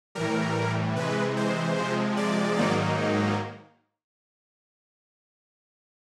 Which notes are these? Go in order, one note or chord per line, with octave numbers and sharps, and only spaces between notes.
A2 E3 G3 A#4
C3 E3 G#3 B4
C5
C3 F3 G#3
D5
G#2 D#3 F#3 A#3 D#4